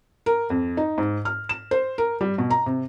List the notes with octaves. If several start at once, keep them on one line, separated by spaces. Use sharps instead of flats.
A#4
F2
D#4
G#2
F6
E7
C5
A#4
G3
B2
A#5
C3